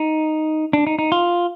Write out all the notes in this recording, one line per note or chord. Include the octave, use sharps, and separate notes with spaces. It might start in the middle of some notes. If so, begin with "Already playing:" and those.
Already playing: D#4
D4
D#4
D#4
F4